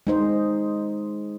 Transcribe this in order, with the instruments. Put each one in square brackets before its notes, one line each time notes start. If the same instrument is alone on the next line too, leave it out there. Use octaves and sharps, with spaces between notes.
[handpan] G#3 D#4 C5